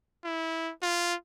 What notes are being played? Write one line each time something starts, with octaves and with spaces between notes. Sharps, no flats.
E4
F4